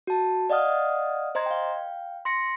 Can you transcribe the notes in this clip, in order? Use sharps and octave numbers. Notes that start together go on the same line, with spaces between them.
F#4 A5
D5 D#5 F5 F#5 D#6 F6
C5 D#5 A#5 C6 G#6
F5 G5
C6 A#6 C#7